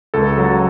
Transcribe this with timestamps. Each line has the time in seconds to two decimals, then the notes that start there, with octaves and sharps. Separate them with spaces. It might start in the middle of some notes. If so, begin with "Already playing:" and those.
0.14 C#2 A4
0.38 F#3